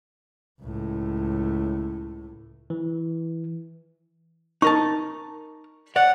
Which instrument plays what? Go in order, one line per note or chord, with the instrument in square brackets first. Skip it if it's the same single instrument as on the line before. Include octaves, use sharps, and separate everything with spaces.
[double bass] C#2 A2
[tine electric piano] E3
[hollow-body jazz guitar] D#4 A#4 A5 [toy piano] C#6
[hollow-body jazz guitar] C#5 D5 [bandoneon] F#5